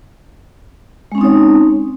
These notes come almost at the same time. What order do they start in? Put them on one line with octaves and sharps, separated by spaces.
G#3 C#4 C4 D#4 C#5